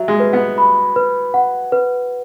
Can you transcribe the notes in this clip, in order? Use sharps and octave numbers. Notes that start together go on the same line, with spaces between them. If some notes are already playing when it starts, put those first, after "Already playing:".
Already playing: F#3 E5
G#3
B4
B3
B5
B4
F#5
B4